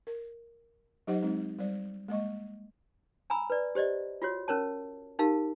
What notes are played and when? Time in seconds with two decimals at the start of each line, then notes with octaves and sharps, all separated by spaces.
0.07 A#4
1.07 F#3 D#4 G4 C5 D#5 F#5
1.22 G#3 C4 D#4
1.59 G3 C5 D5
2.08 G#3 A#3 D#5 C#6
3.30 G#5 A#5 B5 E6
3.50 B4 D5
3.75 G4 C5 D5 D#5
4.22 F4 F#4 C#5
4.48 C#4 A#4 C#5 A5
5.19 D#4 G4 A#4 F5 A5